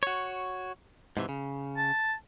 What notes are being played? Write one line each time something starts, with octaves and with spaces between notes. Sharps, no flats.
F#4 C#5
G#2 C3 E3
C#3
A5